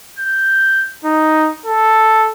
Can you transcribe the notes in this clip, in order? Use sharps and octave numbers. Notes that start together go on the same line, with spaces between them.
G6
D#4
A4